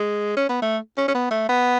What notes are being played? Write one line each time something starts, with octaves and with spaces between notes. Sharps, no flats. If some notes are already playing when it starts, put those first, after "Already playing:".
Already playing: G#3
C#4
B3
A3
C#4
C#4
B3
A3
B3